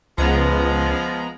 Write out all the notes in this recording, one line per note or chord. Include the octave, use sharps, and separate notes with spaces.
C#2 F3 G#3 B3 A#5